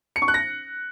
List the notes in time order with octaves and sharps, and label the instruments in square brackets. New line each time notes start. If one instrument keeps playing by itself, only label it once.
[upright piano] C#7
C#6
F#6
A#6